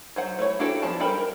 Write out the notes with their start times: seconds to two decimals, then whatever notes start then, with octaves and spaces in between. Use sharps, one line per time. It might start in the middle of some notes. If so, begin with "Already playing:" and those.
0.16 F#3 C5 F#5
0.39 A3 E4 C#5
0.59 D4 E4 F#4 G4 A4
0.82 F3 B3 A5
1.00 G3 A4 A#4 G5 B5
1.18 A#4